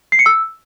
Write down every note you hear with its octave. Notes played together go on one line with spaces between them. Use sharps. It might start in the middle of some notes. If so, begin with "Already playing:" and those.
C7
C#7
E6